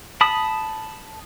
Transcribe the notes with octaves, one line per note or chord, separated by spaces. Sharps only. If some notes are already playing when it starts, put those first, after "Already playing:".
A5 B5 D#6